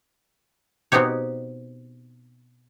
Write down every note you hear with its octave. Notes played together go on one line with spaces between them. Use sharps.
B2 B3 C4 D#4 G4 C#5